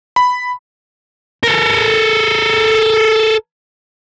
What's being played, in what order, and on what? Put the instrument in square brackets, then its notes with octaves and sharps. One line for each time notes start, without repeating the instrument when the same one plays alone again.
[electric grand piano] B5
[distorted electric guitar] A4 A#4